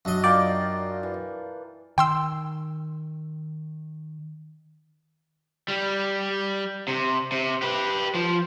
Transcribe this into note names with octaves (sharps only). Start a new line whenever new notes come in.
F#2 D4 D#5
F4 A#4 D5 G5
E3
D#3 G5 C6 E6
G3
C3
C3
G4 B4
F3